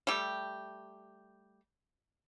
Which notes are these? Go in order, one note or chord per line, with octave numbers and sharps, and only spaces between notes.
G3 A3 G4